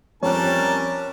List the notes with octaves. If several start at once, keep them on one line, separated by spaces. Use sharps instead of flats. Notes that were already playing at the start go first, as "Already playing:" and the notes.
F2 G3 C4 C#4 A#4 C#5 A5 F#6